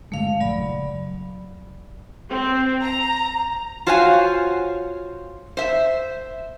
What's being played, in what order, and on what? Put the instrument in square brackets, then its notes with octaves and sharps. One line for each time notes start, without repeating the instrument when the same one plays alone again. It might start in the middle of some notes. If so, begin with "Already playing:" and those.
[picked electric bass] G2 D3 G#3 [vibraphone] A3 F5
[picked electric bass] A#1 [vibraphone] F#3 D5 B5
[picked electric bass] F#1
[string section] C4
A#5
[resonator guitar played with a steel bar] F4 F#4 C5 C#5 F5 G#5
C5 E5